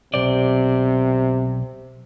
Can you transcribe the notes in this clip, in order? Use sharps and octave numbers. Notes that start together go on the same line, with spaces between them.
B1 C3 C5 D5